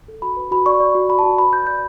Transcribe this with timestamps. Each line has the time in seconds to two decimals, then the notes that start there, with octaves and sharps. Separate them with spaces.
0.08 A4
0.22 F#4 B5
0.37 B4
0.51 F#4 B5
0.66 D5 C#6
0.80 D5
0.95 F#4
1.10 F#4 B5
1.19 A5
1.24 F#4
1.38 B4 B5
1.53 F#4 G6
1.67 D5 G6